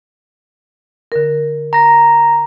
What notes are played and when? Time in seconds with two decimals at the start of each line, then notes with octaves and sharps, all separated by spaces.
1.12 D3 A#4
1.73 A#5 A#6